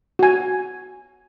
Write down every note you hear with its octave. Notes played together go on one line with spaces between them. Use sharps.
F#4 G#5